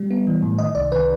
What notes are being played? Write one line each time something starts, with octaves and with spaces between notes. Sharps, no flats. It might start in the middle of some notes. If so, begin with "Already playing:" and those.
Already playing: G3
B3
E3
A2
D#3 D#5
C2 D5
D#3 B4